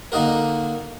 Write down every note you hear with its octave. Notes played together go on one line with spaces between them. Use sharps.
D3 A#3 D#4 F#4 A#4